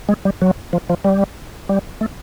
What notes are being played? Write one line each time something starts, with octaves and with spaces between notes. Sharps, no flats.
G#3
G3
F#3
F3
F3
G3
G3
A3